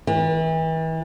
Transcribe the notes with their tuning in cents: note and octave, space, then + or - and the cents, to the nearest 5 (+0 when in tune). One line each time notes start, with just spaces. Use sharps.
E3 -35